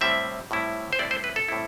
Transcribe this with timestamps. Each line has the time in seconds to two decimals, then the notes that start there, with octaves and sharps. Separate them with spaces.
0.01 A2 G3 C4 E4 E5
0.51 A2 G3 C4 E4
0.93 C5
0.99 A2 G3 C4 E4 D5
1.11 C5
1.24 B4
1.36 A4
1.48 A2 G3 C4 E4